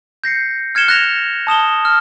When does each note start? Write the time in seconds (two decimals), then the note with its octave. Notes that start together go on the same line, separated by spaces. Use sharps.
0.24 G6 A#6 C7 C#7
0.75 F6 G#6 C#7 E7 G7
0.88 F#6 A6 A#6 F7
1.47 A5 D#6 E7 G7
1.85 F6